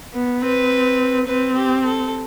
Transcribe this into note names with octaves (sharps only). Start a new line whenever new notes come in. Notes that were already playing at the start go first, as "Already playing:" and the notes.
B3
C4 B4
C4 B4
G4
A4